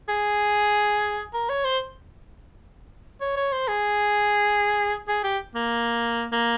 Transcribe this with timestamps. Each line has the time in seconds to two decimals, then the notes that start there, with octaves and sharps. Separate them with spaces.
0.09 G#4
1.33 A#4
1.49 C#5
1.64 C5
3.21 C#5
3.37 C#5
3.52 C5
3.68 G#4
5.08 G#4
5.24 G4
5.55 A#3
6.33 A#3